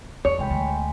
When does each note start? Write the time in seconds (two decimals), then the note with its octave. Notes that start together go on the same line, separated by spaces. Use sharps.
0.25 E2 A4 C#5
0.38 C2 G#3 G5 B5
0.51 D2 D3